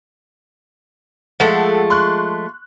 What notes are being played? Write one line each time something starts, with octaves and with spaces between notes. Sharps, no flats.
F3 G#3 A3 A4 F#5
C6 C#6 F#6